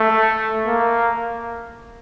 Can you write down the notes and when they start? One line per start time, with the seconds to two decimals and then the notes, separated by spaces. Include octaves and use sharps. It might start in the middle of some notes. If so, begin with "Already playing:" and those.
Already playing: A3
0.66 A#3